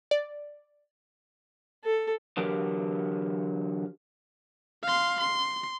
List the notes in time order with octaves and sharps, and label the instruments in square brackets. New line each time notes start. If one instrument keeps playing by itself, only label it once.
[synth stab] D5
[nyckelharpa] A4
[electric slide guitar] D3 E3 F#3 G4 A#4
[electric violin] F5 C6
C6